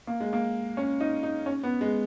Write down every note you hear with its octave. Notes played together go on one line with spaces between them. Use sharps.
A#3
G#3
A#3
C#4
D#4
D#4
C#4
B3
G#3